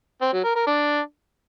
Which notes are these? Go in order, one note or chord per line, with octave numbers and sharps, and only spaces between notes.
C4
F#3
A#4
A#4
D4